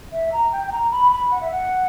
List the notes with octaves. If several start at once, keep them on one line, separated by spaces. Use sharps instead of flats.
E5
A#5
G5
G5
A#5
B5
B5
F#5
E5
F#5